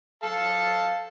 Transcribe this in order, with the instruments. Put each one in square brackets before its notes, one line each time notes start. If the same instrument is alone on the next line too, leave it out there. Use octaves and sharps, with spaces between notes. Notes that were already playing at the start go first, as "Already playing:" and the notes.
[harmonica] A4 F5 A5